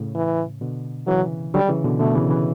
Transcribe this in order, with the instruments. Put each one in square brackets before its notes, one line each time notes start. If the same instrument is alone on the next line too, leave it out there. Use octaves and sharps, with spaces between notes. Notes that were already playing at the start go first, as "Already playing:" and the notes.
Already playing: [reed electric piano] A2 C#3
[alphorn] E3
[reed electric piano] B2 D3
[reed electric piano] C#3 E3 [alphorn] F#3
[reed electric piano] D3 F#3 [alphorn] G3
[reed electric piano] C#3 E3
B2 D3
[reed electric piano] B2 D3 [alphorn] A3
[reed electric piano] C#3 E3
C#3 E3